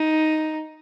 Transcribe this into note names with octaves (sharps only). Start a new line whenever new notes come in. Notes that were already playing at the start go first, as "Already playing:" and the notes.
Already playing: D#4